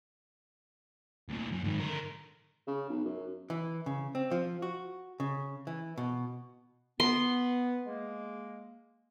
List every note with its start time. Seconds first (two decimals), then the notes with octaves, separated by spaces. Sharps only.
1.29 D2 A#2
1.52 F#2
1.64 G#2 D#3
1.80 D3 A#4
2.67 C#3
2.90 B1
3.05 F#2
3.50 E3
3.86 C#3
4.15 C4
4.31 F3
4.62 F#4
5.20 C#3
5.67 E3
5.98 B2
7.00 B3 C6
7.85 G#3 A#3